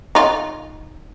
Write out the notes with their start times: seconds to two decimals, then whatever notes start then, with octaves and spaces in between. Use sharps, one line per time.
0.15 D#4 F4